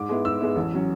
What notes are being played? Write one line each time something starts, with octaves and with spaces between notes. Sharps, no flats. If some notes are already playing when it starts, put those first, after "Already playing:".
Already playing: G#2 D6
G#3 B3 E4
G#2 E6
G#3 B3 E4
A1
F#3 C#4